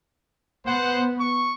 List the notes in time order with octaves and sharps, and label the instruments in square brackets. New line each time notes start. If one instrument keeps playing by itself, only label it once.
[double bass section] B3 [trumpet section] C5 F#5
[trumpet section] C#6